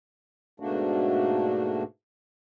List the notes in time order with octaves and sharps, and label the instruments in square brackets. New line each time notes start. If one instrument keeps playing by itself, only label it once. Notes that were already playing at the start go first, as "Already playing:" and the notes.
[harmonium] G#2 B2 A3 A#3 D4 F#4